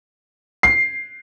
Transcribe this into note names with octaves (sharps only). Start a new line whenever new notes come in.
C7